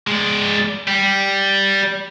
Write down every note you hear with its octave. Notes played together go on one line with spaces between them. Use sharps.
G#3 D5
G3